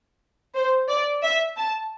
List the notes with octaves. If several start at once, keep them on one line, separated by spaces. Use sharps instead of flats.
C5
D5
E5
A5